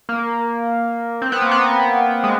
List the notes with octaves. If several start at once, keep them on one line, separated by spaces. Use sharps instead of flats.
A#3
C4
B3
A#3
B3
G#3